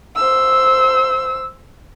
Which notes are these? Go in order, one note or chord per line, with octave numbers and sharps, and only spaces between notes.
C5 E6